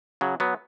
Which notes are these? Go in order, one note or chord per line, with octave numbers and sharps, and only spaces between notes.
C#3 F#3
F#3 B3